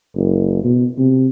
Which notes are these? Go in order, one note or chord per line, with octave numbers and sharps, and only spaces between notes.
F#1
B2
C3